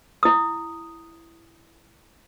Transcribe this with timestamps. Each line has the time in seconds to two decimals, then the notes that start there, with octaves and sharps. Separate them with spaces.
0.23 E4 D#6